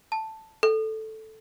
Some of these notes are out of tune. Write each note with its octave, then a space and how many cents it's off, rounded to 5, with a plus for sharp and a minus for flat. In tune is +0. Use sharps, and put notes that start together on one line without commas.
A5 +5
A4 -5